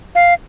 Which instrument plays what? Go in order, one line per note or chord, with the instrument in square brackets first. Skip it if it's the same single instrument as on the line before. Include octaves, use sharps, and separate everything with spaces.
[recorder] F5